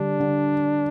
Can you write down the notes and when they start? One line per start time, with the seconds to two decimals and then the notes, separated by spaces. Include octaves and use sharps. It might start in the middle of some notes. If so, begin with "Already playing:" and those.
Already playing: D3 G3 D4
0.20 D3